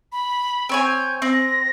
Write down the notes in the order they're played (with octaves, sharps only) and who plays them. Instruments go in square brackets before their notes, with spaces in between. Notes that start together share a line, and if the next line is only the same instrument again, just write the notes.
[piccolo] B5
[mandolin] C4 C#5 G#5
[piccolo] G6
[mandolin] C4 [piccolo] A#6